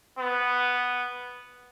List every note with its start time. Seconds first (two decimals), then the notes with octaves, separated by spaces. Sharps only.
0.18 B3